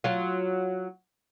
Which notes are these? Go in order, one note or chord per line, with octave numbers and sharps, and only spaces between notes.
F#3 F4